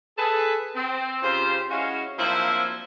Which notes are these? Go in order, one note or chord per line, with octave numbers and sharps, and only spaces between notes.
G#4 A4 B4
C4
C#3 F4 G4 C5
G#3 C#4 E4 F#4 F5
F3 F#3 A#3 C4 D4 E4